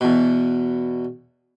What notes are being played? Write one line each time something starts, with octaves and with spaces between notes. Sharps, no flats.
E2 B2